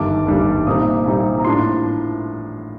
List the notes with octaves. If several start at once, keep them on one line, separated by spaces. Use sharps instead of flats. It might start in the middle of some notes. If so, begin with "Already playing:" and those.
Already playing: G1 G2 D#3 G3 D4 D6
G1 G2 D#3 G3 D4
C2 A#2 G3 C4 D#4 D#6
C2 A#2 G3 C4 D#4
A#5
A2 F3 A#3 D4 C6